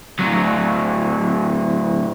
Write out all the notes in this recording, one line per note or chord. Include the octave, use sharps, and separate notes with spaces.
A2 F#3